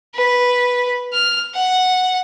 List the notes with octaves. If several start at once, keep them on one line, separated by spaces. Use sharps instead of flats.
B4
F6
F#5